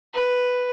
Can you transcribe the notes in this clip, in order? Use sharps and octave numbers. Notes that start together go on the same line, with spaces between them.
B4